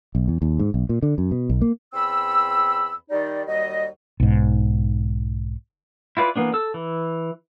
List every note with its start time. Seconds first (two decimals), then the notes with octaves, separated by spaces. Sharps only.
0.15 B1
0.28 E2
0.42 D#2
0.59 G#2
0.74 B1
0.89 A#2
1.03 D3
1.18 F#2
1.31 B2
1.50 B1
1.62 A#3
1.94 E2 C4 B5 E6
3.10 D#3 G3 D#4 D5
3.47 D#2 F#3 G3 D#5
4.20 B1 G#2
6.17 E4 F4 B4 D5
6.36 E3 A#3 B3 D4
6.54 A4 E6
6.74 E3